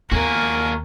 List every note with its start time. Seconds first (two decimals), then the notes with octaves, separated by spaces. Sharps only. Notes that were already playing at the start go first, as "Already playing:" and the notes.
0.12 D#2 A#3 B3 F#4 A#4 G#5